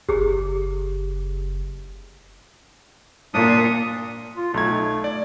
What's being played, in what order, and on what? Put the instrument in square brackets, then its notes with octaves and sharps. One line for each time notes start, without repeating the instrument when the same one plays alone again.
[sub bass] F#1 [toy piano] G4 G#4
[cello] A#2 [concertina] D4 D#6
[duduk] F4
[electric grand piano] B1 A#5 G#6 [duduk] A3
[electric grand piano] D#4
D5